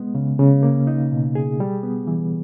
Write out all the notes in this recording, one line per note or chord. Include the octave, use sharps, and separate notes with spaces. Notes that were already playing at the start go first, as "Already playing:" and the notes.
Already playing: G#3 B3
C#3
C#3
A#3
D#4
B2
G#4
G3
B3
E3